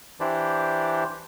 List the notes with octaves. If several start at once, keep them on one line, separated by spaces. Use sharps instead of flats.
E3 D4 E4 G4 C5 D5